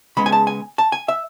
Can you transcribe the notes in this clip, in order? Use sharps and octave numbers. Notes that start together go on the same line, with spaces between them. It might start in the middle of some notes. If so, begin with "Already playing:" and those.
C#3 G#3 B3 B5
G#5
A5
G#5
A5
G#5
E5